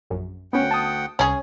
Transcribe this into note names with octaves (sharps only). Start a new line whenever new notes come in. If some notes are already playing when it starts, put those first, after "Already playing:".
A#1 F#2
D2 B3 C#4 F#5 G5
A5 D#6
C2 C#4 G#4